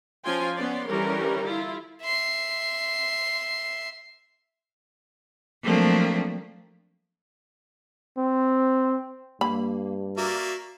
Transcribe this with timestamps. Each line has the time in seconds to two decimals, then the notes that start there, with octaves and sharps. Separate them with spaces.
0.24 F3 C#4 F4 G5 G#5 C6
0.57 B3 C#4 D5 C6
0.88 D3 E3 G3 C#4 A#4
1.46 E4 F4
2.02 E5 C6
5.63 F3 F#3 A3 A#3 C4 D4
8.18 C4
9.41 G2 A#3 B5
10.17 A#3 F#4 D5 E5